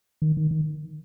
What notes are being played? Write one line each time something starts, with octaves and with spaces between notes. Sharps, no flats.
D#3
D#3
D#3